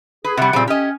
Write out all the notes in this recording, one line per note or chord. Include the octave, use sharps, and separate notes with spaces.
G#4 B4
C3 G3 F#5
A#2 C#3 F3 G3 C4
C#4 G4 D#5